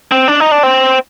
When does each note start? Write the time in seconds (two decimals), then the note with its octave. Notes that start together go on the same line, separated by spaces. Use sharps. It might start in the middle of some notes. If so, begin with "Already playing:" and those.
0.12 C4
0.28 D4
0.40 D#4
0.51 D4
0.63 C4